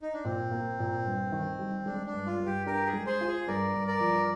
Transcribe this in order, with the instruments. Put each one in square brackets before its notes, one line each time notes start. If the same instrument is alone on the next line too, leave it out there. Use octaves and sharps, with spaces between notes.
[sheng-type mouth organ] D#4
D4
[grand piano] A#2 [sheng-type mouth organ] C4
[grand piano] A#3
A#2
G2
D#3
G3
[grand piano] G#3 [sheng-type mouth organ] D4
[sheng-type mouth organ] D4
[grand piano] G2
[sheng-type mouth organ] F4
[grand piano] G2
[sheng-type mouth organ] G4
[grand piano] D4 [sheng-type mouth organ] G4 A#4
[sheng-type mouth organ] G#4
[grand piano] G#3
[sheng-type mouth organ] G#4 C5
[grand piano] F4
[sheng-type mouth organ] G#4
[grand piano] G2 [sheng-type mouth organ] A#4 D5
[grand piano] G2
[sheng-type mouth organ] A#4 D5
[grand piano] F3